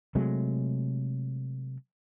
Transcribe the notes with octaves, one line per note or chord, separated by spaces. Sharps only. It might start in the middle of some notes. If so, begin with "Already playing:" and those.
C3 F#3 G#3 A3